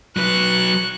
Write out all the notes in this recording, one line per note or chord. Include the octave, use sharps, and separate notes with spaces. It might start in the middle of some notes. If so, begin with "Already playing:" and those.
F#3 B4 C#6 F#6